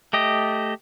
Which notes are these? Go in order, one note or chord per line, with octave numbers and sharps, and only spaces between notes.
A3 G4 D#5